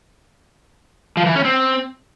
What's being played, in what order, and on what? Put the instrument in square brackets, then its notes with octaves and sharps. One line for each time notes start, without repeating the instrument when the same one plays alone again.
[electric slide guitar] F3
E3
C#4
C4